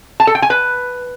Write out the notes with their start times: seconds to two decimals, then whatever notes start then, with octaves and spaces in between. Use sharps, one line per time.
0.20 A5
0.27 A4
0.35 G5
0.42 G#5
0.50 B4